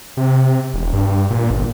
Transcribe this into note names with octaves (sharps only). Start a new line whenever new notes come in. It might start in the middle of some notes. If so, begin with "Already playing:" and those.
C3
E1
G2
A#2
G1